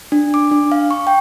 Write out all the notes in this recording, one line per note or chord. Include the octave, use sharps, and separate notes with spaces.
D4
D6
D4
F5
C#6
G5